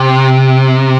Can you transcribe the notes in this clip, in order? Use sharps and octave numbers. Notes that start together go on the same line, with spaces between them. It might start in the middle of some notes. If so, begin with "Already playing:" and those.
Already playing: C3